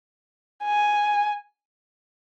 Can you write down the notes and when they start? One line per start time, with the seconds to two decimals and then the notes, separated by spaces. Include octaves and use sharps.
0.64 G#5